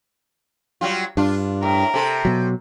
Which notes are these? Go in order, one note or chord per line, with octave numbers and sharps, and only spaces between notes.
F#3 G3 F4
G2 D4 F4
A2 A#4
C3 A4
B2 F#3